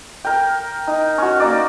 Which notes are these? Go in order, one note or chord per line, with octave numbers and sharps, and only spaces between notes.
A#4 G5
D#4
C#4 F#4
A#3 D#4 D5